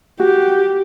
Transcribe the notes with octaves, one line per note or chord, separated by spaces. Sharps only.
F#4 G4